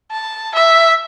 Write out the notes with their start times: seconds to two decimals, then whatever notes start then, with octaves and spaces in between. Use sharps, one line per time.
0.11 A5
0.55 E5